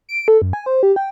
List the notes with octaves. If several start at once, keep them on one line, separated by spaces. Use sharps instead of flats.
D7
A4
F#2
G#5
C5
G4
G5